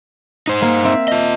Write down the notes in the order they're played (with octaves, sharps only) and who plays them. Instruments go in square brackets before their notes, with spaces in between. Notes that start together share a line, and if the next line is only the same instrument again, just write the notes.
[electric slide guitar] D#4 C5
[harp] A#3
C4 E5
[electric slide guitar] F4 D#5